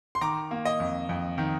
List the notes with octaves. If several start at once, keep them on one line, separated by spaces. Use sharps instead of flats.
C6
D#3 A#5 D6
A#3
D#5
F2
F2
D#3